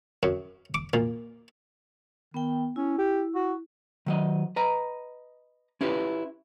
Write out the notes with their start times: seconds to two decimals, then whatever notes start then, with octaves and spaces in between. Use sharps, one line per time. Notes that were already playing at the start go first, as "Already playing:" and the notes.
0.23 F#2
0.74 D6
0.94 A#2
2.34 D#3 B3 G5
2.76 C#4 E4
2.98 G4
3.35 F#4
4.06 D#3 F#3 D#5
4.56 B4 D#5 A#5
5.81 C#4 E4 F4 G4 B4